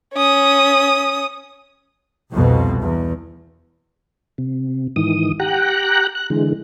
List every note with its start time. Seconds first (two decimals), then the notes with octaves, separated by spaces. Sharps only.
0.14 C#4 D#6
2.32 C2 F2 B2
2.81 E2
4.38 C3
4.96 G#2 D#3 E3 D#6
5.40 G4 F#5 G5 A#5 F#6
6.15 F#6
6.30 D3 E3 G#3